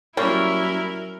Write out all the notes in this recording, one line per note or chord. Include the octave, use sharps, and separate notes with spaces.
F#3 G3 A#3 C#4 E4 A#4 C#5